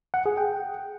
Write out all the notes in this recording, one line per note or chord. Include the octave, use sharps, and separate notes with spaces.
F#5
G#4
G5